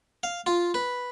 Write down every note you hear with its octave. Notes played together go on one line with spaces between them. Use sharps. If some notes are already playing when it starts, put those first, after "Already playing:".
F5
F4
B4